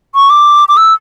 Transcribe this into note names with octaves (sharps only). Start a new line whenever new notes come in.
C#6
D6
D6
E6